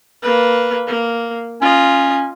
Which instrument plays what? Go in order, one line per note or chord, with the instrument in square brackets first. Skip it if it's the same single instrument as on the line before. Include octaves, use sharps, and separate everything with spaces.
[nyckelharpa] A#3 B4
A#3
[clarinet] C#4 [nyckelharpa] F4 D#5